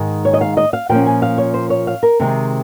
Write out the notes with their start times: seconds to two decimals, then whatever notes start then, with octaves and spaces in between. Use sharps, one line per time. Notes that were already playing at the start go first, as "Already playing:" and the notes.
Already playing: G#2 D#3 G#3
0.25 C#5
0.34 D#5
0.41 F5
0.57 D#5
0.73 F5
0.89 A#2 F3 A#3 C#4 G5
1.06 G#5
1.22 F5
1.38 C#5
1.54 C5
1.70 C#5
1.87 F5
2.03 A#4
2.20 C3 D#3 G#3 C4